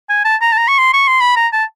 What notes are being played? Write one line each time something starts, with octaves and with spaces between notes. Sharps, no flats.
G#5
A5
A#5
A5
A#5
C#6
C6
C#6
C6
B5
A#5
A5